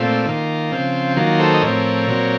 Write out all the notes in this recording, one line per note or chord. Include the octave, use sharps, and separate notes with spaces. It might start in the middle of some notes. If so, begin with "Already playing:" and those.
Already playing: A#2 A3 C4 F4
D#3 A#3
C#3 F3 C4
D#3 F#3 A#3 F4
A4 C5
D#5
A2 F3 C4 A#4 C#5
A#2 F#3 C4